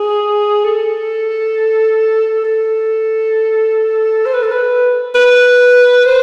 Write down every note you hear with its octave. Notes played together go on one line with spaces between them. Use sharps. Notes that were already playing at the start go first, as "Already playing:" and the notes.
Already playing: G#4
A4
A4
C5
B4
A4
B4
B4
C5